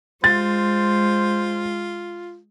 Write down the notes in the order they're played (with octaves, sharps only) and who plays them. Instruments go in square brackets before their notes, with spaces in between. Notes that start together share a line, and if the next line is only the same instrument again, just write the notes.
[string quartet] G#3 [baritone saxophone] F4 [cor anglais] C5 [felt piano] A6